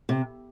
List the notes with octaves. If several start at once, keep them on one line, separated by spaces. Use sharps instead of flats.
C3